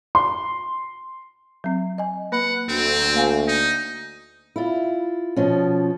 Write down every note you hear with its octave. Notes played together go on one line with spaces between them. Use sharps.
C6
F#3 C4
D#5 G#5
A#3 B4 F#5 B5
D2 C4
A#3 F5 G#5
D#4
E4 F4
B2 F3 C#4